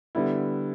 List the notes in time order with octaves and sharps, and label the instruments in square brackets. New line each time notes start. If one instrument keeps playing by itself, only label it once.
[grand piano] D3 G3 B3 E4